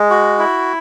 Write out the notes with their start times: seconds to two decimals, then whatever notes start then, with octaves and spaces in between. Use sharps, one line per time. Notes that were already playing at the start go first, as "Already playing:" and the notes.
Already playing: G#3
0.10 F#4
0.39 E4